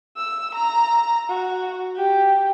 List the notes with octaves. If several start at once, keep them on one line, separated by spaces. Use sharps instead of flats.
E6
A#5
F#4
G4